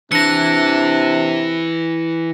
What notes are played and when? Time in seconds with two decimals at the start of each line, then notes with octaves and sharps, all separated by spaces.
0.12 C3 E3 D4 A#6 C#7